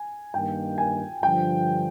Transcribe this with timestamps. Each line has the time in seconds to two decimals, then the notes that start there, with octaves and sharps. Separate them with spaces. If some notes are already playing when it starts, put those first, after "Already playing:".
Already playing: G#5
0.34 G2 D#3 A#3 G5
0.78 G#5
1.23 G2 D3 F3 G5